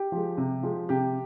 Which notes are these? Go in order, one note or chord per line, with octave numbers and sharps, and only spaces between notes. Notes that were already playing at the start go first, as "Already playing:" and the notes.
Already playing: G4
F3 G#3
C3
F3 G#3
C3 G4